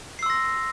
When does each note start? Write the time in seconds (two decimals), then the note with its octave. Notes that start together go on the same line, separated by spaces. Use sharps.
0.19 C7
0.23 E6
0.26 C6
0.30 A#6